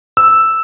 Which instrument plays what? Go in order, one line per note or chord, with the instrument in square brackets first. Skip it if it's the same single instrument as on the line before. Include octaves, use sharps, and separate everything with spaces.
[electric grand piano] E6